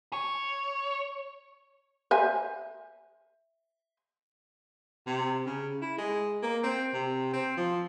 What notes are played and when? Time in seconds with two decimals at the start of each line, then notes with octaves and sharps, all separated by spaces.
0.13 C#5
2.11 C5 E5 G#5
5.06 C3
5.46 C#3
5.81 E4
5.98 G#3
6.43 A#3
6.63 C4
6.93 C3
7.33 C4
7.57 F3